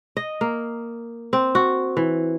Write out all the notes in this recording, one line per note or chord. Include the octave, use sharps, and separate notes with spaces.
D#5
A#3
C4
F#4
E3